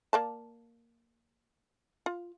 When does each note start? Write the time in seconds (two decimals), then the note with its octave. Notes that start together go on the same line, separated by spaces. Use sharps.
0.13 A#3 D5 A5
2.06 F4